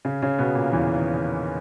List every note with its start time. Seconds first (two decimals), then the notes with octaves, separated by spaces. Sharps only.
0.05 C#3 C#4
0.22 C#3 C#4
0.38 B2 B3
0.55 A#2 A#3
0.72 E2 E3
0.95 D#3